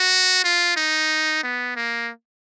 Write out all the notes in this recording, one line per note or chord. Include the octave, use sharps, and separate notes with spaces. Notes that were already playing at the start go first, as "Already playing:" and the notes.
Already playing: F#4
F4
D#4
B3
A#3